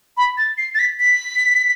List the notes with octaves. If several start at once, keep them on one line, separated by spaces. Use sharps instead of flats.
B5
A6
C7
A6
B6
B6